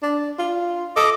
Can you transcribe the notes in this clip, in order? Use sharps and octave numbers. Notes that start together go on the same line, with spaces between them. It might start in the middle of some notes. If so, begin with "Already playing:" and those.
D4
F4
A4 D#5 D6